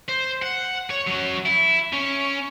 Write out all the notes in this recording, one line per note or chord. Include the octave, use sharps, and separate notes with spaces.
C5
F#5
C#5
F#3 C#4
E4
C#4